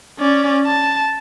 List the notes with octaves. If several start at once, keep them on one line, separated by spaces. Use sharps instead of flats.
C#4 D5
A5